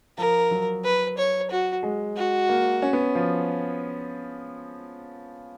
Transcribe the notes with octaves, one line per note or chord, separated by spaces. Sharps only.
F3 A#4
F#3
B4
C#5
F#4
G#3
F#4
A#3
C#4
B3
F3